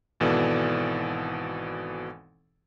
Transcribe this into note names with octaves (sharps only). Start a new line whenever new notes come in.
G#1 B2 E3 A4 D5